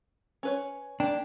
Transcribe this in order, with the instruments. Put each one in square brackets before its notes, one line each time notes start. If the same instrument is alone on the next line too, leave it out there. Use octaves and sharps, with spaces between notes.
[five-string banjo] C#4 B4 C#5
[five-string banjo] A#3 G4 [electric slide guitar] D4